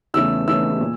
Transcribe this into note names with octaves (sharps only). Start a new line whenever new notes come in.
E2 C#3 E3 A3 E6
E2 C#3 E3 A3 E6
A#2